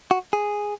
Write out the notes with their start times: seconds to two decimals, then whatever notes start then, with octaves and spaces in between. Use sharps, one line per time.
0.11 F#4
0.33 G#4